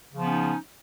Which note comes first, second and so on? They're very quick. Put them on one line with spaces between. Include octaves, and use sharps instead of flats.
C#3 F3 B3 C#4 D#4